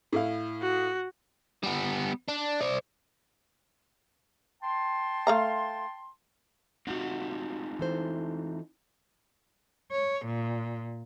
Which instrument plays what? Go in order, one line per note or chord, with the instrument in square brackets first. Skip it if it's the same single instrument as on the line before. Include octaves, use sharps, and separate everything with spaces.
[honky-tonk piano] A2 E4 F5
[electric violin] F#4
[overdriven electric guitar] G3 B3
D4
C5 D5
[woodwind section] G5 A5 C6
[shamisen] A3 F5 A#5
[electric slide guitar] C4 D#4 F4 [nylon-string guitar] F#4 F#5
[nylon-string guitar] E3 A4 C5
[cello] C#5
A#2